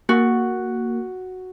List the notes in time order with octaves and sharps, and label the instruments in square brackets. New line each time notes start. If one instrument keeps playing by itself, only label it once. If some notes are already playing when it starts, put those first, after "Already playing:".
[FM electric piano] A#3 [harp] F#4